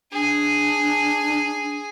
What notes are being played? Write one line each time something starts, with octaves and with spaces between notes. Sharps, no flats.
D4 G#4 G#5